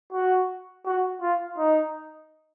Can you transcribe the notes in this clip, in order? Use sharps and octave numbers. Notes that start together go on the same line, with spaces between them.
F#4
F#4
F4
D#4